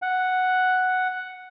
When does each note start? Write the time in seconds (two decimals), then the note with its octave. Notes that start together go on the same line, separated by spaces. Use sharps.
0.02 F#5